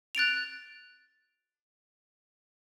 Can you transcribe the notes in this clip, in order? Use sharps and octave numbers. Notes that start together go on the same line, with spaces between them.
F#6 A6 D7 F7